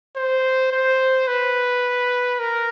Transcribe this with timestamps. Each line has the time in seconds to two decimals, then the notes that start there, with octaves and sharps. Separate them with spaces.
0.17 C5
0.72 C5
1.28 B4
2.39 A#4